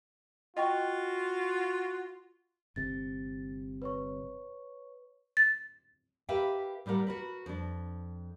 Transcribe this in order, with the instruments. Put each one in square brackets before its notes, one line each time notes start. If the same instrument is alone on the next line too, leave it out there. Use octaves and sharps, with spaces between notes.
[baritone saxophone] F4 [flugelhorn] F#4 [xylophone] D#5 G5 C#6
[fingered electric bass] G1 C3 [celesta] A6
[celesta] B4 C#5 C#6
[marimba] A6
[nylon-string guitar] G4 A#4 B4 E5 F5 G5
A2 G3 G4 A#4 F#5
F#4 A#4 B4
F2 D4